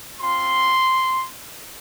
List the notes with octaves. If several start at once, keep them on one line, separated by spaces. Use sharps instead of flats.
C4 F4 C6